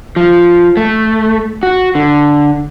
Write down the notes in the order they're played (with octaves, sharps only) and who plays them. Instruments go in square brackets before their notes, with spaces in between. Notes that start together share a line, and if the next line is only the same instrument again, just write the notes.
[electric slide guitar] F3
A3
F#4
D3